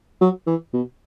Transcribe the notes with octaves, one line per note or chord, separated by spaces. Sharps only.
F#3
E3
B2